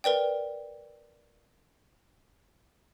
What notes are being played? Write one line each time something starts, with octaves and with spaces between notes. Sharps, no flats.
A#4 B4 D5 G5